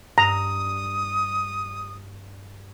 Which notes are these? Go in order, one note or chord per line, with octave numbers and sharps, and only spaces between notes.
G2 A#5 D#6